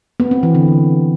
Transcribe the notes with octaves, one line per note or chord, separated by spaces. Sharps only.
B3
C4
E3
D3